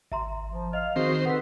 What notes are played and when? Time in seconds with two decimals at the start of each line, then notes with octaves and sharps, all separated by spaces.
0.12 G#1 E5 A#5 C6
0.51 F3
0.73 D#5 F5 F6
0.96 D#3 C4 F#4 G#4 C5
1.26 A4 B4 F#5 C6 B6